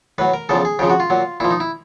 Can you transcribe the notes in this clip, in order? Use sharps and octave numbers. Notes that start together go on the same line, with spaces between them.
A2 F#3 B4
A#4
E2 C#3 F3 A4
G#4
F2 C#3 F3 G4
F#4
F4
A#2 F#3
A#2 F3 E4
D#4
E4